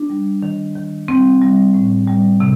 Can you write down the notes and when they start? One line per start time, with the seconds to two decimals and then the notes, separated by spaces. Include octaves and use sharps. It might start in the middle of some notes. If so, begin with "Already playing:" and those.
Already playing: D4
0.10 G3
0.43 D#3
0.75 D#3
1.08 G3 C4
1.41 G3
1.74 A2
2.08 G3
2.40 C3